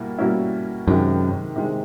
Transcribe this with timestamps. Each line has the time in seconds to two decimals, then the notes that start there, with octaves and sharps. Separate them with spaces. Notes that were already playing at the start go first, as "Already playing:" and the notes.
Already playing: B2 G3 A#3 E4
0.18 B2 G3 A#3 C#4 E4
0.87 F#2 C3 D#3 G#3
1.56 C3 D#3 G#3